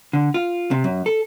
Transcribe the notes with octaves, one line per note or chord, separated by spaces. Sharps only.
D3
F4
C3
F#2
A4